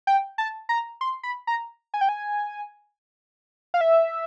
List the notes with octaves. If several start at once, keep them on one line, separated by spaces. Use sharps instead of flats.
G5
A5
A#5
C6
B5
A#5
G#5
G5
G#5
F5
E5